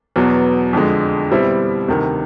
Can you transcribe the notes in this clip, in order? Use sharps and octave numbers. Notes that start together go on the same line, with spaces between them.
E2 B2 F#3 B3
F2 D3 F3 G#3
B2 G3 C4 E4
D2 C3 D#3